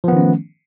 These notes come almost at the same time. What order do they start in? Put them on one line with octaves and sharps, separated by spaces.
F3 B3 D#3 C#4 A3